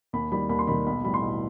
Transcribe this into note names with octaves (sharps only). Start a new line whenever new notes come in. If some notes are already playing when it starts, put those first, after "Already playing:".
D#2 B5
D#3 G3 B5
D#2 B5
C6
D#3 G3 B5
B1 B5
A2 E3 G3 B5
C6
B1